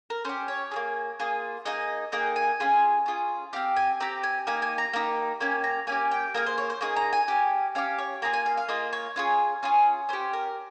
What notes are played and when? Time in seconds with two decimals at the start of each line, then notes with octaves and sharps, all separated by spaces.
0.10 A#4
0.25 C#4 G4 C5
0.48 C#5
0.71 F4 G#4
0.76 A#3
1.19 A#3 F4 G#4
1.65 A#3 D#4 G#4 D#5
2.12 A#3 D#4 G#4 G5
2.36 G#5
2.60 C#4 F4 G#4
3.06 C#4 F4 G#4
3.53 C4 G4 F5
3.76 G#5
4.00 C4 G4 A#5
4.23 G#5
4.47 A#3 D#4 G4 G#5
4.62 G#5
4.78 A#5
4.93 A#3 D#4 G4
5.40 A#3 C#4 G4 G#5
5.64 A#5
5.87 A#3 C#4 G4 G#5
6.11 G5
6.34 A#3 D#4 G#4 A#4
6.46 C5
6.58 C#5
6.70 C5
6.81 A#3 D#4 G#4 C#5
6.96 A#5
7.13 G#5
7.28 C#4 G4
7.75 C#4 G4 F5
7.98 C#5
8.22 A#3 F4 G#4 A#5
8.33 G#5
8.46 F5
8.57 F5
8.68 A#3 F4 G#4 D#5
8.93 C#5
9.16 C#4 F4 G#4
9.63 C#4 F4 G#4
10.09 C#4 G4 C5
10.33 A#4